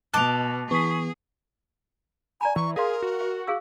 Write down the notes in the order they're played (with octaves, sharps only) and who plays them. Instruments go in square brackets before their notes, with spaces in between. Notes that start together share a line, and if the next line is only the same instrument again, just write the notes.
[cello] B2 [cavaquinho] D#5 A5 D6 [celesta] F#6 F7
[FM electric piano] E3 B3 [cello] G#4 [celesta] C#6 B6
[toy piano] D5 A#5 B5 [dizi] G#5
[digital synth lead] E3 [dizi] C#6
[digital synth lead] G#4 [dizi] A#4 [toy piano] E5 F5 C6
[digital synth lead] F#4
[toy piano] E5
G#4 F5 E6